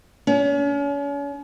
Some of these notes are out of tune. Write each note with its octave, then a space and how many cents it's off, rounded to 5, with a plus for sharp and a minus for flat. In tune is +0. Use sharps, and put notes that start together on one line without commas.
C#4 +40